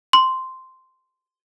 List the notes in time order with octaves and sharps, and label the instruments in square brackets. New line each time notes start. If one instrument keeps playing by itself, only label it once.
[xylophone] C6